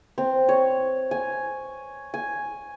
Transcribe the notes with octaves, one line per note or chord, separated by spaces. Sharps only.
C4
C#5
G#5
G#5